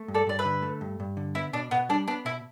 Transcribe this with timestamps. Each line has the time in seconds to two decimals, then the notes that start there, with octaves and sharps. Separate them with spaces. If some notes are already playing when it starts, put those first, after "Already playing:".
Already playing: A3
0.08 G2
0.14 A4 D5
0.27 G2 D5
0.39 B4 E5
0.45 D3
0.62 A3
0.81 G2
1.00 G2
1.17 D3
1.35 B3 E4
1.53 B2 D4
1.71 B2 B3
1.89 G3 D4
2.08 B3 D4
2.25 B2 E4